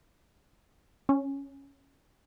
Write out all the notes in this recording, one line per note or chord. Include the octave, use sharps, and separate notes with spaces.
C#4